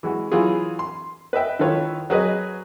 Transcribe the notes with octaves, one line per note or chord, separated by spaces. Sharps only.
E3 G#3 F#4
E3 F#3 F4 G#4
C6
B4 D#5 E5 G5
D#3 E4 F4 A4 B4 C#5
F#3 G#4 B4 D#5